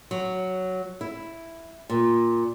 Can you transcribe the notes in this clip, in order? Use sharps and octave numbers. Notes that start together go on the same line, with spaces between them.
F#3
E4
A#2